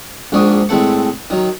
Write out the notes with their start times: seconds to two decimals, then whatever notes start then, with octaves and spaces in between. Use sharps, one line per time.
0.32 A#1 G#2 D4 C#6 D#6
0.69 A2 G#3 C4 A4 F#5 C#6
1.30 D#3 F#3